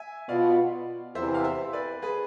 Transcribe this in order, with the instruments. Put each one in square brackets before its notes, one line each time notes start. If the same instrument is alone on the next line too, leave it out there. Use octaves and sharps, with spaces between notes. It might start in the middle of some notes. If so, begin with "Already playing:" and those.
Already playing: [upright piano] E5 G#5
[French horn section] B2 B3 F4 [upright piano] D5 F5
[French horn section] E2 C3 E3 [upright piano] C5 E5
[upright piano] F5
C5 E5
B4 D5
G#4 B4